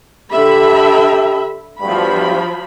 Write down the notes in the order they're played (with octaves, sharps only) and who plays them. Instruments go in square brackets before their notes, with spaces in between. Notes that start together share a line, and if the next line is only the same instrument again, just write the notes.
[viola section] D3 E5 B5 [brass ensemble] G4 A4
[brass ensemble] E2 G2 [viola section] F3 F#3 B5